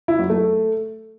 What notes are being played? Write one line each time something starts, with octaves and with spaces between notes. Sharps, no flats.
E4
F#3
A3